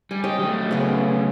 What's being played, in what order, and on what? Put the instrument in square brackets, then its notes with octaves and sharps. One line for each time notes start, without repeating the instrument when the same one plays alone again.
[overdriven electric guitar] G3 [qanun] G#5
[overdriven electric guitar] G4 [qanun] C#5 D#5 C6
[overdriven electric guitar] F#3 A3
[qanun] C#3 B3